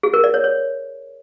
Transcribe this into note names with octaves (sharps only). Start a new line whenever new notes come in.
G#4
A#4
D5
C#5
C#5